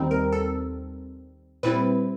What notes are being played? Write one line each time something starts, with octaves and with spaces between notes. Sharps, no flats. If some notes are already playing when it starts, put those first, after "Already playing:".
Already playing: D#2 D#3 G3 C4 D#4
A#4
A4
A#2 G3 C4 E4 B4